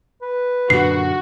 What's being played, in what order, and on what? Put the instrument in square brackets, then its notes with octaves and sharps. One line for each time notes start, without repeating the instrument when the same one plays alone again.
[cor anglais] B4
[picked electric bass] F#2 A#2 D3 [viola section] F#4 [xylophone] C7